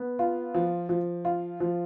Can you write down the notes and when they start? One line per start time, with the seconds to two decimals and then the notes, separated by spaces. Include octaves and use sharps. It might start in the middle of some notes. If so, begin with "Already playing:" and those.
Already playing: B3
0.19 F4
0.54 F3
0.89 F3
1.25 F4
1.60 F3